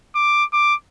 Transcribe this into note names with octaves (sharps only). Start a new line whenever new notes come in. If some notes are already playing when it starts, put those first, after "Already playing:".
D6
D6